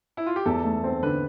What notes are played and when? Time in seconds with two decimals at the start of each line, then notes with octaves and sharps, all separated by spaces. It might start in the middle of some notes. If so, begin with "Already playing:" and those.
0.17 E4
0.26 F4
0.36 G4
0.45 E2 A4
0.64 A3
0.84 C4
1.03 D3 B4